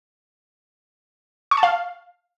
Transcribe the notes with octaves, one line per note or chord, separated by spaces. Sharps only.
C#6
A5
F5